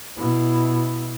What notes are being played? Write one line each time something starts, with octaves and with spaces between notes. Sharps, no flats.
B2 E4